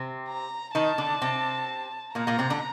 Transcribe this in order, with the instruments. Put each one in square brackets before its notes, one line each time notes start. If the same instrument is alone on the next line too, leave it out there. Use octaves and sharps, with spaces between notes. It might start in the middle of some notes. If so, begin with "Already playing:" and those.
Already playing: [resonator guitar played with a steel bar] C3 C4
[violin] A#5
[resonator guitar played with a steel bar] D#3 D#4 [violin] A5
[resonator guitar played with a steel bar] D3 D4
C3 C4
[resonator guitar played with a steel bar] A#2 A#3 [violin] A#5
[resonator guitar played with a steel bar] A#2 A#3
C3 C4
D3 D4